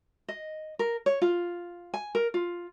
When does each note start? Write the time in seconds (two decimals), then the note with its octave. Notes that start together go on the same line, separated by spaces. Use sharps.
0.28 D#5
0.79 A#4
1.06 C#5
1.22 F4
1.94 G#5
2.15 A#4
2.34 F4